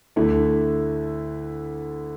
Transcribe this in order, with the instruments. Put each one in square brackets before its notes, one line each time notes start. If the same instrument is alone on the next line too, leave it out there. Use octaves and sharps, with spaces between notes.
[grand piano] D2 D3 A3 E4